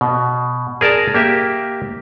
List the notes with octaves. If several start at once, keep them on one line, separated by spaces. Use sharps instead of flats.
B2
G#4 A#4 D5 A5
A#3 G4 E5